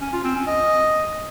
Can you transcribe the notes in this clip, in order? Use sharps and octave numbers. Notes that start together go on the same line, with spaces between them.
C#4
F4
C4
C#4
D#5